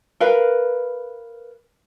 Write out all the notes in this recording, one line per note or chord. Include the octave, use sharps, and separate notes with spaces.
A#4 B4 F5